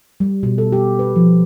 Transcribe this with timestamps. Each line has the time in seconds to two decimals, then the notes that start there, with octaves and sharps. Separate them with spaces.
0.20 G3
0.43 B2
0.58 A4
0.72 G4
0.99 B4
1.16 F3